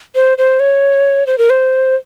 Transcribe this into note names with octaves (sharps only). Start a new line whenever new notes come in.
C5
C5
C#5
C5
A#4
C5